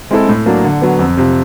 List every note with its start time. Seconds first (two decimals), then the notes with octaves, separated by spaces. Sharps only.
0.11 G#3 C4 E4 A4
0.29 A2
0.46 F#3 A#3 D4
0.64 D3
0.82 F#3 B3
0.99 F2
1.17 C3 F3